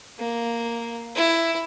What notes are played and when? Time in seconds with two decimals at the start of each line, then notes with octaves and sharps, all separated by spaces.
0.19 A#3
1.16 E4